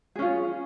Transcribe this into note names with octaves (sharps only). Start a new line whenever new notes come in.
C#4 F4 G#4